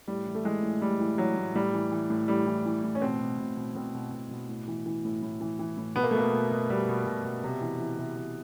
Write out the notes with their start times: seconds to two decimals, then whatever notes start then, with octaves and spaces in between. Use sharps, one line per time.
0.08 A2 G3
0.26 E3
0.35 A3
0.45 E3 G#3
0.63 A2
0.82 A2 G3
1.00 E3
1.18 E3 F#3
1.37 A2
1.55 A2 G3
1.74 E3
1.92 E3
2.10 A2
2.28 A2 G3
2.47 E3
2.66 E3
2.84 A2
2.95 C#4
3.02 B2 C4
3.21 B2
3.39 B2
3.57 B2
3.75 B2 C4
3.94 B2
4.12 B2
4.31 B2
4.49 A2
4.68 E3
4.86 E3
5.05 A2
5.23 A2
5.41 E3
5.59 E3
5.77 A2
5.96 B2 B3
6.03 A#3
6.11 A3
6.14 B2 A#3
6.33 B2
6.51 B2
6.70 B2 G3
6.89 B2
7.07 B2
7.25 B2
7.44 C3
7.61 E3
7.80 E3
7.99 C3
8.17 C3